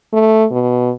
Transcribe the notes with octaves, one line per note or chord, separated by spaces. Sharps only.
A3
B2